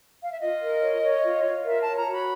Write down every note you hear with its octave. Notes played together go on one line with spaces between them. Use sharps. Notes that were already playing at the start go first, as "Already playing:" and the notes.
F5
E5
F4 D#5
A#4
C#5
C#5
F4
F4
A#4 E5
A5
C#5
A#5
F#4 B5